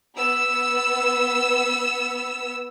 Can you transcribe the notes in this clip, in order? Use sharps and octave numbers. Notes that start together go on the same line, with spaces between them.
B3 E6